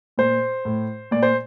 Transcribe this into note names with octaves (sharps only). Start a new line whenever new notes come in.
A#2 C5
A2
A#2 D5
C5